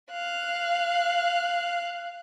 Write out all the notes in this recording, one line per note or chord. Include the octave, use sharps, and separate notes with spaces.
F5 F#6